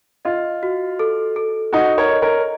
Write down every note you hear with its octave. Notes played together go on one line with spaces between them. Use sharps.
F4 D#5
F#4
A4
A4
D#4 F#4 D#5
A#4 C#5
D#5
A#4 C#5